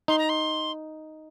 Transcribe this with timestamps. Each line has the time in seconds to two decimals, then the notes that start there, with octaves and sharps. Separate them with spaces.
0.08 D#4 C6
0.19 A#5
0.29 C6